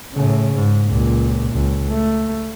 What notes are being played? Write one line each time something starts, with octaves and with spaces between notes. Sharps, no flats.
A2 C#3
G#2
C#2 A#2
C#2
A3